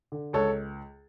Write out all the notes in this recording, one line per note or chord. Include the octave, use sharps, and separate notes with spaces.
D3
C#2 A4 C#5